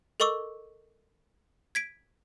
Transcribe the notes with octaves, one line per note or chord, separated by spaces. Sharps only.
A4 A#4 D#5 C#6 D6 E6
G#6 B6 D7